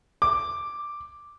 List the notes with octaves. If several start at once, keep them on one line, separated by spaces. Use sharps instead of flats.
D6